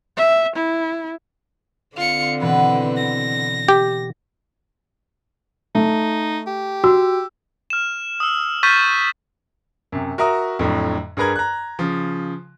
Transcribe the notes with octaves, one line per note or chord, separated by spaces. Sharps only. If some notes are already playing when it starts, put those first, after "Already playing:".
E5
E4
D3 C4 F4 C#7
B2 E3 B3 B4
A#6
G4
A3 D#4
G4
F#4 E6
F6 E7
D#6 E6
C#6 F6 G6 A6 B6 D#7
F#2 C3
F#4 A#4 E5 A#5 D#6
F2 A2 D3 F#3
G2 G#4 A#4 B4 A#5 G#6
A#5 F#6
C#3 F3